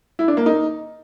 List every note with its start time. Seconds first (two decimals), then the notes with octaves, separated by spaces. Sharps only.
0.19 E4
0.28 D4
0.37 A#3
0.46 D#4